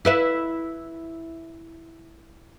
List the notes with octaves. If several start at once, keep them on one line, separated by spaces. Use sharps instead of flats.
E4 B4 E5